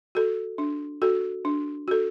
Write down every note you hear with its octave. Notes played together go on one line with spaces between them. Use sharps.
F#4 A4
D4
F#4 A4
D4
F#4 A4